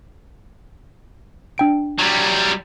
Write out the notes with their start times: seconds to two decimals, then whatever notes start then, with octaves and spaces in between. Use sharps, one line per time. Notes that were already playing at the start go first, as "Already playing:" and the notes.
1.58 D4 G5 D7
1.99 F#3 G3